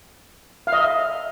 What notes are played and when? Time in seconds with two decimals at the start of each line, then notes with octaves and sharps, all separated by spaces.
0.67 F5
0.72 D#5
0.78 E5